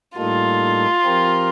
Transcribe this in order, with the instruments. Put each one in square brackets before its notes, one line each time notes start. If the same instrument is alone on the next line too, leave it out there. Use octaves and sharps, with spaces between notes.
[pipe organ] A2 G3 A#3 D#4 A4 [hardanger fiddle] F4
[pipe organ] F3 C4 G4 A#4